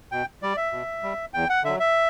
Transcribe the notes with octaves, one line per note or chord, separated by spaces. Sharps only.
B2 G5
G3 D5
E5
B2
G3
E2 G5
F#5
D3 F#3 E5
E5